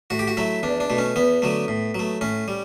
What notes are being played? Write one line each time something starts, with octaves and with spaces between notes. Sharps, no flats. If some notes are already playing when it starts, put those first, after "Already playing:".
A2 F#4
G4
F#4
F#3 A3 E4
E2 D4
D4
B2 A3
C#4
E2 B3
D3 F#3 A3
A2
F#3 A3
A2 C#4
G3